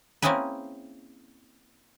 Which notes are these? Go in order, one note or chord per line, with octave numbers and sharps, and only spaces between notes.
A#3 C4 C#4 E4 G#4 B4